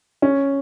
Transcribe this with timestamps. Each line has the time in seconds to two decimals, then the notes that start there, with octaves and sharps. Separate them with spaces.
0.22 C#4